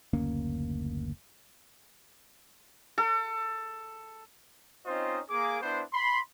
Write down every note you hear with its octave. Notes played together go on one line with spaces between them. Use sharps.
F#1 D2 A#3 C#4
A4
C4 C#4 D#4 F4 C5 D#5
A#3 G#4 D6
B3 D4 E4 C5
B5 C6